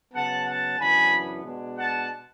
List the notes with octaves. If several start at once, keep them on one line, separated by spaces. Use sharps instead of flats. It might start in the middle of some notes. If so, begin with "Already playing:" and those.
C#3 F#3 B3 F#5 A5
F#5 A5
F#2 C#3 E3 B3 D4 G#5 B5
B2 G#3 D4
F#5 A5